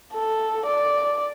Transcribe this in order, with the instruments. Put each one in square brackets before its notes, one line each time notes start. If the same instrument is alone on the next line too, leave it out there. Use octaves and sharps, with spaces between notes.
[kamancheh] A4
D5